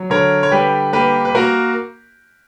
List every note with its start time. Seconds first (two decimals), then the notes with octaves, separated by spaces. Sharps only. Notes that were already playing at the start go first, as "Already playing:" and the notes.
Already playing: F#3
0.10 D3 A#4 C#5
0.43 C#5
0.51 G3 G4 B4
0.93 A#3 G4 B4
1.25 B4
1.35 A#3 F#4 A#4